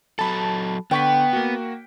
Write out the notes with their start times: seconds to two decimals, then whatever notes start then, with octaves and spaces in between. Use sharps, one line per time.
0.19 F#3 A4 A5 B5
0.91 D3 B3 G5 C#6 B6
1.33 A#3 F#4